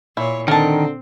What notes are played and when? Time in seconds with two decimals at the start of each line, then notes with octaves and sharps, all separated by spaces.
0.17 A#2 E4 C#5
0.48 D3 D#3 C4 A#4 A5